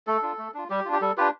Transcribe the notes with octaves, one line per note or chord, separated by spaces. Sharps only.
A3 A4
D4 F4
A3
D4 F4
G3 G4
D4 F4
G4
G3 A4
D4 F4 G4 B4